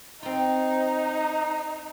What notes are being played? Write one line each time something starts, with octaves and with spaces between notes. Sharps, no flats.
C4 D#4 F4